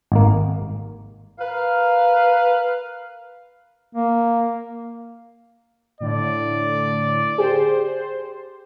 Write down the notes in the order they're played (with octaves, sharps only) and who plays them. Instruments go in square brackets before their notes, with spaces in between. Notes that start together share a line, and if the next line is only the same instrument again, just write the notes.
[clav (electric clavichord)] G#1 A#3
[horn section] A#4 B4 F5
[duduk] A#3
[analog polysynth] A2 D3 [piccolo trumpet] D5
[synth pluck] G4 G#4 [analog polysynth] C5